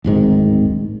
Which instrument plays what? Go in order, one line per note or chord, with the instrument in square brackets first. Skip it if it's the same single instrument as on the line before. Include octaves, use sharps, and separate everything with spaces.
[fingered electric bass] D1 G#1 G#2 D#3